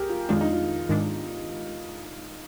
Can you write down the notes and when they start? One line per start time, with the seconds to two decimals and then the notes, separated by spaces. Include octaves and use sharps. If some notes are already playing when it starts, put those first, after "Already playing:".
Already playing: C2 G4 G#4 A#4
0.09 F4
0.29 F2 D#3 G#3 D4 F4
0.41 D#4
0.53 F4
0.89 G#2 D#3 G#3 D4